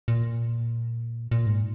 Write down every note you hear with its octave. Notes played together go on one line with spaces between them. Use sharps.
A#2
A#2
G#2